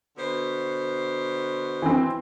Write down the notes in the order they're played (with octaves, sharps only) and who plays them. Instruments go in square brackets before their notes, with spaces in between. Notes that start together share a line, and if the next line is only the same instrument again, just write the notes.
[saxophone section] B2 D3 C5
[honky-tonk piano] E3 C4